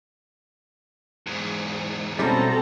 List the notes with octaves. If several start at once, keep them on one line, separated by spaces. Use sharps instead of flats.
E2 G#2
B2 G3 C4 C#4 E4 A4 C5 A#5